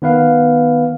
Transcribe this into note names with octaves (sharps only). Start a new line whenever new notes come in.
D#3 B3 B4 F5